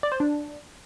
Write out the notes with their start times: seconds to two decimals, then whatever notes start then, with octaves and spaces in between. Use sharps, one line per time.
0.03 D5
0.12 C5
0.20 D4